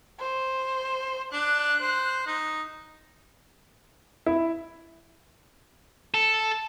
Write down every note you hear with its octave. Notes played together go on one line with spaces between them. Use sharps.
C5
D4 F#6
C5
D#4
E4
A4